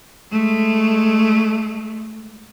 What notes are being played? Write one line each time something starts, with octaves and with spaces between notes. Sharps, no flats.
G#3 A3